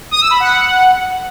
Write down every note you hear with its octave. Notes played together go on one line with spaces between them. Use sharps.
D#6
E6
B5
F#5